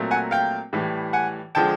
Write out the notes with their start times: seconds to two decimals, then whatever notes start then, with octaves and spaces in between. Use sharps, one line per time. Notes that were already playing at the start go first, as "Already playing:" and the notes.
Already playing: A#2 F#3 A3 C4
0.11 F#5 G#5
0.31 F5 G5
0.73 A2 E3 G3
1.13 F#5 G#5
1.55 D3 F3 G#3 G5 A5